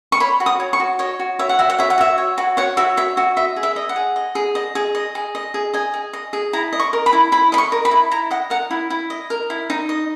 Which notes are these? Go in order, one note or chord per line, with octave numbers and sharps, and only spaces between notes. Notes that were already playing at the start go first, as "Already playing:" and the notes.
C#6
C#5 B5
F#4
D#6
C#5
C#6
F#4
C#5 D#5
F#4
C#5 E5
F#5
F#4 E5
F#5
C#5 E5
F#5
F#4 E5
C#5
F#4
C#5 F#5
F#4 E5
C#5 E5
F#4 E5
D#5 E5
G#4
E5
D#5
F#5
G#4
D#5
G#4
D#5
G#4
D#5
G#4
D#5
G#4
D#5 G#5
G#4
D#5
G#4
E4 A#5
D#5
C#6
A#4
B5
E4
E4 B5
D#5 B5
C#6
A#4
B5
E4
E4 A#5
D#5 F#5
A#4 F#5
E4
E4
D#5
A#4
E4
D#4
D#5